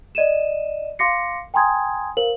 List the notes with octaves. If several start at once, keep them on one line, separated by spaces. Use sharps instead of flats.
D5 D#5 D#7 E7
F5 C6 D6 A#6 C7 C#7
G5 G#5 A#5 C6 D#6 G#6
A#4 C5 F5 F#7